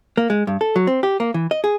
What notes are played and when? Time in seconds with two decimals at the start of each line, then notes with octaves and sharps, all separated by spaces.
0.17 A#3
0.30 G#3
0.47 G2
0.61 A4
0.76 F#3
0.87 C4
1.03 G4
1.20 A#3
1.34 E3
1.51 D#5
1.64 G#4